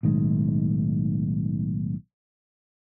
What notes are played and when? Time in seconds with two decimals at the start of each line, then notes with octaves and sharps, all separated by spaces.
0.03 B1 A2 D#3 G#3